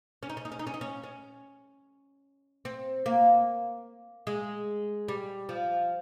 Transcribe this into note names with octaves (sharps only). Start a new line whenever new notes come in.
C#4
D#4
C#4
D#4
C#4
D#4
C#4
D#4
C#4
C#4
C4
A#3
G#3
G3
F3